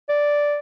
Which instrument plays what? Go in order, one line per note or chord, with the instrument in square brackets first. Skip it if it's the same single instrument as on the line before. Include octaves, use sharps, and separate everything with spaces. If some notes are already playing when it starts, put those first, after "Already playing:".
[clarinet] D5